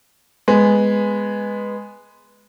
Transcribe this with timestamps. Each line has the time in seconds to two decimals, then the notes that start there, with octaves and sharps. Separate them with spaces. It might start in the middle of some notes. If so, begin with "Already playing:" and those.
0.48 G#3 B3